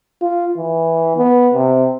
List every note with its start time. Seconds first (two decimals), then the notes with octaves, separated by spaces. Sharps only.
0.22 F4
0.58 E3
1.17 B3
1.54 C3